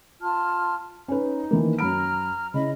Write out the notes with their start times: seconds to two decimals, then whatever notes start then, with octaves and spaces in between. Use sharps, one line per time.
0.20 F4 A5 F6
1.08 C#4 D#4 B4
1.51 D#3 E3 A#3
1.79 F#2 A#5 B5 F6 D7
2.54 C#3 E4 D#5 B5